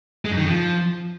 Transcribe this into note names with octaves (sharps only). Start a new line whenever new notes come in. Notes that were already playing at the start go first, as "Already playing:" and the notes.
G#3
F#2
D#3
F2
F3